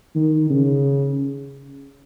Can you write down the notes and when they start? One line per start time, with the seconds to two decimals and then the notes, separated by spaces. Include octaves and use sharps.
0.15 D#3
0.50 C#3